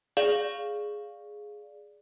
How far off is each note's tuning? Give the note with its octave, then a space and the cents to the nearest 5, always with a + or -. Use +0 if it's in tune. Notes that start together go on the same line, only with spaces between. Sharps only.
G#4 +0 D5 +0 F5 +0